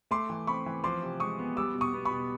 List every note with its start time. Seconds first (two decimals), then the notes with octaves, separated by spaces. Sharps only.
0.11 A3 C6 D6
0.30 E3
0.47 C4 B5 C#6
0.66 E3
0.84 F3 C6 D6
1.02 C3
1.20 G#3 C#6 D#6
1.39 B3
1.57 G3 D6 E6
1.75 B2
1.81 C#6 D#6
1.93 B3
2.05 B5 C#6
2.11 B2